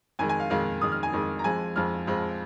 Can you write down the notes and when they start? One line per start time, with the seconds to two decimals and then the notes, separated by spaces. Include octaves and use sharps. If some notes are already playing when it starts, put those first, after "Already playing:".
0.19 F2 D#3 G#3 G#5
0.29 G#5
0.40 F5
0.50 F2 D#3 G#3 F5
0.81 F2 D#3 G#3 D#6
0.92 F6
1.03 G#5
1.13 F2 D#3 G#3
1.39 A#5
1.44 F2 F3 G#3 G#5
1.75 F2 F3 G#3 F6
2.07 F2 F3 G#3